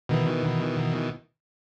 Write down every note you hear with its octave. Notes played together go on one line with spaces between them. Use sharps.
B2 D#3 E3